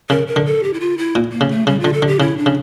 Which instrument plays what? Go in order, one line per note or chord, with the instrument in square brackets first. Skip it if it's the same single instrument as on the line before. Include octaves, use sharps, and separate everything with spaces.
[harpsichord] C#3 [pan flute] A#4
[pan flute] A#4
[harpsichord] D3
[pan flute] A4
G4
E4
F4
E4
[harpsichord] A#2
[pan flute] A#3
[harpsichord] C#3
[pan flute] A3
[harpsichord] C#3 [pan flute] G3
[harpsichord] D3 [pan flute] F4
[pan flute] A4
[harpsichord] D3
[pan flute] G4
[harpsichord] C#3 [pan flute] E4
[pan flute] D4
[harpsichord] C#3